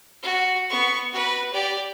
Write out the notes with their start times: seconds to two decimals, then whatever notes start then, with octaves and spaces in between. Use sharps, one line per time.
0.23 F#4
0.70 B3 C#6
1.12 F#4 B4
1.52 G4 D5